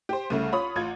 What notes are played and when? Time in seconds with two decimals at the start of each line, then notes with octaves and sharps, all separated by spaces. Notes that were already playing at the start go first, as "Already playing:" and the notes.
0.09 G4 C5
0.30 C2 C#3 A3
0.52 F4 C#5 B5 D#6
0.76 A1 F4 G#6